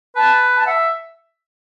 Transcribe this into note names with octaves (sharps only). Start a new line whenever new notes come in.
B4 A5
A5
E5 F#5